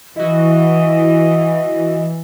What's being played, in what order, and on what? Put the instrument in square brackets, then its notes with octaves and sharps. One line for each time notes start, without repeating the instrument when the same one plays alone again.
[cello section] E3 [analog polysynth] E4 F#4 [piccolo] D#5